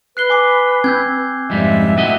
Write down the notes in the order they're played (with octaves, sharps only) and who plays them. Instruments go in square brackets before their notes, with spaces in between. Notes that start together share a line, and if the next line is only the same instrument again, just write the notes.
[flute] B4 [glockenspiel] F#6 C7 G7
[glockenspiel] G#5 D6 C7
[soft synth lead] C4 [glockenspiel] E6 G6 G#6
[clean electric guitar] F2 G#2 G3 [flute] E5
[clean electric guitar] A2 F#4 D#5 [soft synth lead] C4